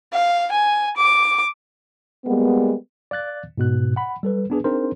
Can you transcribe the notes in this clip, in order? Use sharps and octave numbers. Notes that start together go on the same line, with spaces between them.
F5
G#5
D6
G3 G#3 A#3 B3
D5 F5 F#6 A6
G#2 B2 F#6
F#5 B5
G3 A4 B4
B3 D4 G#4 B4
C4 D4 D#4 G#4 A#4 C5